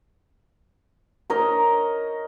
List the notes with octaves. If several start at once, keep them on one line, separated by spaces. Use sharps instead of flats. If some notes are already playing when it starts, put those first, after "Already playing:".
D#4 A#4 C#5 D#5